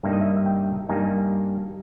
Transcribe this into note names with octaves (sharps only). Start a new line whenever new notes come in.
G2 G3 A#3 D#4 E5
D#5
E5
E5
G5
G2 G3 A#3 D#4 G#5